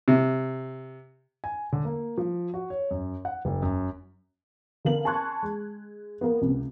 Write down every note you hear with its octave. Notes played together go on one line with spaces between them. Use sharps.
C3
G#5
D3
A#3
F3
F#4
C#5
F#2
F#5
F#1
F#2
D3 B3 A#4 F5 F#7
G#5 A5 C6 C#6 F#6 G#6
G#3
A#3 B3
C#2 C3